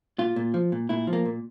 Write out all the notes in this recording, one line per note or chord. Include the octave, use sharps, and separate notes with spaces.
A#2 F4
A#2
F3
A#2
A#2 E4
F3
A#3
A#2